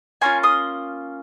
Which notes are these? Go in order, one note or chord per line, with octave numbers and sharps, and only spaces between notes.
A#3 C#4 F4 G#5 C6
C6 D#6